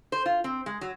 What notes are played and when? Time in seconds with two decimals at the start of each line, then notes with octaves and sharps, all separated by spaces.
0.12 C5
0.26 F4
0.44 C4
0.66 G#3
0.81 F#3